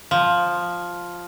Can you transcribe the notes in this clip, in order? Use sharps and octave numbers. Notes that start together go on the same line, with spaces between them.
F3